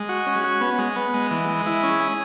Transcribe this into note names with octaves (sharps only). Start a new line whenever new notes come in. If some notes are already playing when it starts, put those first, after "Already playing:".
Already playing: G#3
F#4
C#4
F#4
B3
G#3
B3
G#3
E3
G#3
E4
C#4
G#4